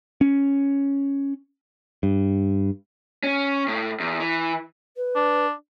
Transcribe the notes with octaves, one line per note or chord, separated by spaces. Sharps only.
C#4
G2
C#4
A2
E2
E3
B4
D4